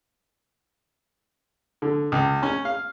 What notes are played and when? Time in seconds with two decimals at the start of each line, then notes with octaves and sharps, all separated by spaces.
1.82 D3
2.12 C#2
2.43 C#4
2.65 F5